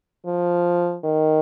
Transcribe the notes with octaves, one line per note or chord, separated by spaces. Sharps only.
F3
D#3